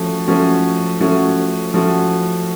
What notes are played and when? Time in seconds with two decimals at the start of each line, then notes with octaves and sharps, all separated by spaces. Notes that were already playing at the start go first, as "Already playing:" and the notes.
Already playing: F3 A3 C#4 F#4
0.28 F3 A3 C#4 F#4
1.00 F3 A3 C#4 F#4
1.74 F3 A3 C#4 F#4